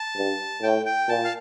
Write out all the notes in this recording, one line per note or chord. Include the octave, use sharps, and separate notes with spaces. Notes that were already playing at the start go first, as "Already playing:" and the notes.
Already playing: A5
G2
A2 G5
G5
A#2 A5
F5